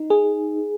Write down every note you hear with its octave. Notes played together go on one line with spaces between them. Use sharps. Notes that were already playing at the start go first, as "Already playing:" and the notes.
Already playing: D#4
G#4